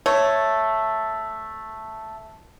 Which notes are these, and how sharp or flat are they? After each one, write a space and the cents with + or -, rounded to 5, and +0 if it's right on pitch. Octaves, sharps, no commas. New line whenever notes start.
A3 +0 C#5 +0